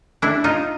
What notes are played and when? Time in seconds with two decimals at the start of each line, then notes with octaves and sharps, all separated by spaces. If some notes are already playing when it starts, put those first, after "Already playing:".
0.22 D4 E4
0.44 D#4 F4